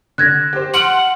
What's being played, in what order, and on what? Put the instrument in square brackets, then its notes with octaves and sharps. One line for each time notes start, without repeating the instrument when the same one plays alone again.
[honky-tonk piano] D3 [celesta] F#6 G#6 A#6
[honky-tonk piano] G4 C5
[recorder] F#5 [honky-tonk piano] C6 F6 D7 [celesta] F#7